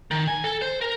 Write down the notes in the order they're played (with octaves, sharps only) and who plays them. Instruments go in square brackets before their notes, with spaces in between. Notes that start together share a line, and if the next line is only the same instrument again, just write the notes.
[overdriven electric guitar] D#3
G#5
A4
C5
A#4